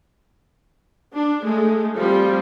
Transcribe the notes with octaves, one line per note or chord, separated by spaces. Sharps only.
D4
G#3 A3
F3 G3 C4 F4